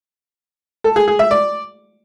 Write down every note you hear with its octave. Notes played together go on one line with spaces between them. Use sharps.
A4
G#4
G#4
E5
D5